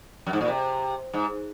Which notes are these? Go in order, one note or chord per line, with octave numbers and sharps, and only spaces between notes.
F#2
G#2
A#2
C3
G#2